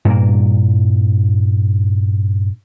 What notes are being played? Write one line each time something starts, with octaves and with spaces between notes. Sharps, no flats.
G2 A#2 A#3